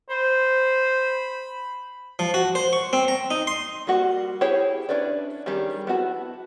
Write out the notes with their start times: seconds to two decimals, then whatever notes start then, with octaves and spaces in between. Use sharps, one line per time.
0.10 C5 B5
2.19 F3
2.34 F#4
2.55 C5
2.73 C#6
2.93 C4
3.08 A#5
3.31 D#4
3.47 C6
3.87 G3 A#3 F#4 F#5
4.41 E4 G4 G#4 C#5
4.89 C#4 D4 E4 B4 D5
5.46 D#3 G3 C#4 G4 G#4
5.87 B3 E4 F#4 A5